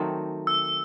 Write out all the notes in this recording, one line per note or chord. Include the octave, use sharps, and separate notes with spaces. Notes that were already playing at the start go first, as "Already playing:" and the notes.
Already playing: D#3 F#3 A3 C4
E6